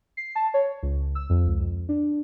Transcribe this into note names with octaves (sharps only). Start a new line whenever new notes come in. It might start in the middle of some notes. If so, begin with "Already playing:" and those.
C7
A5
C#5
C#2
E6
F2
C#2
F2
D4